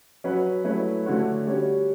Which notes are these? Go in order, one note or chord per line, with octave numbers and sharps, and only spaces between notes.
F#3 C#4 F#4 B4
F#3 A3 C#4 E4 B4
D3 A3 C#4 F#4 C#5
G3 C#4 F#4 C#5